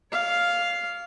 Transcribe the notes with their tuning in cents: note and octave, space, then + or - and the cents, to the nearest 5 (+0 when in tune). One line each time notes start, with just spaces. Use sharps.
C#5 +45 F5 +0